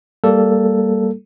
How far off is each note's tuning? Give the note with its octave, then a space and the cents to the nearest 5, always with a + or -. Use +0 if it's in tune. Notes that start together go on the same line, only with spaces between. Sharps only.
G3 +0 A#3 -15 A4 +0